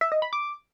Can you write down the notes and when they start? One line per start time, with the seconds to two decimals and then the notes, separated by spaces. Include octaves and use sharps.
0.01 E5
0.12 D#5
0.22 B5
0.33 D6